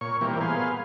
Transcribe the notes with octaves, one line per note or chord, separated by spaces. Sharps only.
A#2 C#5 C#6
A#2 E3 G3 A#3 C4
B3 G#4 F5 C6